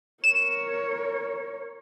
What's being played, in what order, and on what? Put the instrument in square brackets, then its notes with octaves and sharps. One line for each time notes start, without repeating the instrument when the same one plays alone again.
[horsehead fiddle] A#4 C#5 [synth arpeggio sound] E7